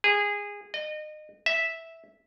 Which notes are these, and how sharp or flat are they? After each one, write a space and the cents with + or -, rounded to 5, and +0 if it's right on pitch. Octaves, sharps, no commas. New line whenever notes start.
G#4 -20
D#5 -30
E5 -5